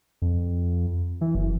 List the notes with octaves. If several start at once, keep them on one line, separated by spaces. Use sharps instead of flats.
F2
E3
F#1